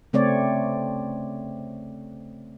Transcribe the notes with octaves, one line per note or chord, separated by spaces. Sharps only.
C#3 A3 C4 C#5 D5